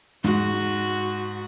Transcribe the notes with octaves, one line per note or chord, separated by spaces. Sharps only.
G#2 F#4